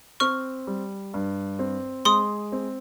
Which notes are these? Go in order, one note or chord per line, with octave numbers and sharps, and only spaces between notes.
C4 C#6 F6
G3
G2
C4
G#3 C6 D#6
C4